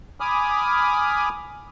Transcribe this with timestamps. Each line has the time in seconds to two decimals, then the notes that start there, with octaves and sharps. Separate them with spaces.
0.20 G#5 B5 D6 D#6 F6